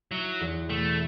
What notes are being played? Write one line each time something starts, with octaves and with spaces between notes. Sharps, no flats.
F#3 E4
E2
B2 A3